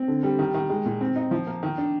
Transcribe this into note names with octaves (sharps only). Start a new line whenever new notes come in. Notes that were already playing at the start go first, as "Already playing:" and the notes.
Already playing: C4
D3
G3
D#3
D#3
G#3
A#2
C4
D#4
F3
A#3
D#3
D4